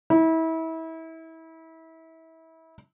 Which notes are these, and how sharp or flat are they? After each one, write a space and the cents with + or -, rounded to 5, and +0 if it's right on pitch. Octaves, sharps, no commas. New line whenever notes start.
E4 -30